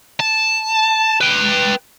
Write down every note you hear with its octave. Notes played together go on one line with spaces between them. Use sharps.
A5
B4 G5